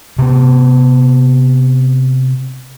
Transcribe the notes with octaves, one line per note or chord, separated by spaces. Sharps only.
C3 B3